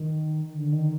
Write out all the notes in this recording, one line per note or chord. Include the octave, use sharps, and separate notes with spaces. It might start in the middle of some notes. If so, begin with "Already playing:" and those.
Already playing: D#3
D3
D#3